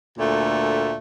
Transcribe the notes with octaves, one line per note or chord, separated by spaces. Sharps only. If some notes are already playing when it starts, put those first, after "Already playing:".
D2 A#2 A3